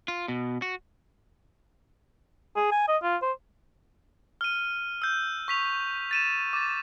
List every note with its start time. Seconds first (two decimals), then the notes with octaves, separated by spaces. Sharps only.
0.08 F4
0.28 B2
0.62 F#4
2.56 G#4
2.72 G#5
2.88 D#5
3.03 F4
3.22 C5
4.41 F6 D#7
5.02 E6 G6
5.48 C#6 B6 F7
6.11 A6 D#7 E7
6.53 D6 A6